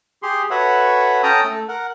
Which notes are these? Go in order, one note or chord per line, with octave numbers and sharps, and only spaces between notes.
G4 G#4 C6
F#4 A4 B4 C#5 E5 F#5
C#4 A4 G5 A5 A#5 D#6
A3 A4
A#4 F#5